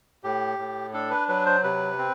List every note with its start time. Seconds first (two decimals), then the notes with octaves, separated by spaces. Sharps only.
0.24 A2 G4
0.59 A2
0.94 D4 A4
1.11 B4
1.28 F#3 B4
1.46 C5
1.63 C3 B4
1.98 C4